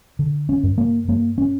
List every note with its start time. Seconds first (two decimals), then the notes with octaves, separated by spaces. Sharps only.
0.19 D3
0.49 C#4
0.63 G2
0.78 A#3
1.08 G2 A#3
1.38 C#4